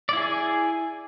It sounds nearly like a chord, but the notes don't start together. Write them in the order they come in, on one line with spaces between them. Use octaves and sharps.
D5 E4 G#4 G#5